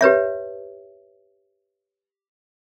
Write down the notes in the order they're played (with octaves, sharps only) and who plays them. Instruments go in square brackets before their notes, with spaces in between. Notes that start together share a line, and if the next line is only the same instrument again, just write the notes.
[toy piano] G4 B4 C#5 E5